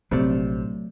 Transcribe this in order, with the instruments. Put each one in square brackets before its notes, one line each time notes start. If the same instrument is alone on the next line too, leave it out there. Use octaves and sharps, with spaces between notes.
[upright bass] A#1 [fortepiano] C3 [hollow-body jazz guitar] F#3 A3 D5